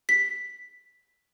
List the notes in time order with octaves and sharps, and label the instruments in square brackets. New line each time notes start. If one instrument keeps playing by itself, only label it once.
[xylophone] B6